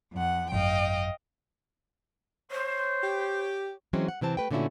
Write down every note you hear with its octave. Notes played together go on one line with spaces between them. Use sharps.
F2 F#5
G#1 F#2 D#5 F5 G5
C5 C#5
G4
E3 F#3 G#3 C4 C#4
F#5
C3 E3 C4 A5
A3 B4 G5
A#2 D3 A3 C#4 E4 F#4